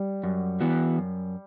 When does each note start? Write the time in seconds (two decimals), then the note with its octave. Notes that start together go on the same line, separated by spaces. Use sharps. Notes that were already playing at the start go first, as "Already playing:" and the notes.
Already playing: G3
0.24 F#2
0.60 E3 B3 F#4
0.98 F#2